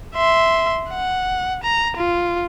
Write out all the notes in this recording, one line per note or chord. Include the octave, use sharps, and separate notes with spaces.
E5 C6
F#5
A#5
F4